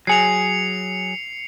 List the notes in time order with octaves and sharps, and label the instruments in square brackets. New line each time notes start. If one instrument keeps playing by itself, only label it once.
[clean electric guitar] F#3 G#4 [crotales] C7 C#7 F7